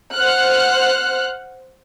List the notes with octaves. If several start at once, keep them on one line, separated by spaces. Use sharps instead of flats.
C5 F#5 F6 F#6